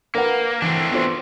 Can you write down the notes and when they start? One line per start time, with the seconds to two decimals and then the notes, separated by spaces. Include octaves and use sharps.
0.15 A#3 A#4 B4 F#5
0.62 E3 A3 C4 D4
0.91 B3 F4 C5